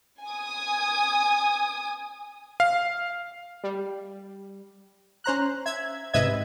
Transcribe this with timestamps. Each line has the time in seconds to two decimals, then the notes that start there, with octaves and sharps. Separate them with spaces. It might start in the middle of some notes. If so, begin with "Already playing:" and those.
0.23 G#5 D#6
2.60 F5
3.64 G3
5.24 C#4 C5 A#5 F#6
5.66 E5 G#6
6.14 G#2 C3 B4 D#5 E5 G#6